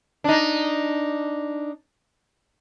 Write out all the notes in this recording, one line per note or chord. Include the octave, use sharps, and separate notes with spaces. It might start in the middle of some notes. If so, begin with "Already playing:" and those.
D4 D#4